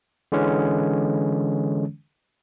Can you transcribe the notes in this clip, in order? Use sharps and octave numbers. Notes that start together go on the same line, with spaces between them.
D3 E3 G#3 C#4